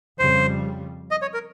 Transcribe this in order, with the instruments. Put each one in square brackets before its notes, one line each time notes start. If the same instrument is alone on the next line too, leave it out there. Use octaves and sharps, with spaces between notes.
[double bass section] F2 C#3 G3 [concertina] C5
[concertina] D#5
C#5
A#4